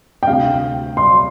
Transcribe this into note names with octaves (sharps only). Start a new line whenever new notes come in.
G5
D2 C3 F5
C6